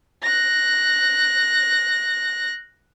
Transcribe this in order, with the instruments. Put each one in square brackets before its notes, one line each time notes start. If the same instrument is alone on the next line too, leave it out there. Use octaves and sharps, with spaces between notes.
[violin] F#6 A#6